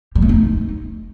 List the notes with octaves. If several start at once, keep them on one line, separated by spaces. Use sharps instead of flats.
G3
A3
D#4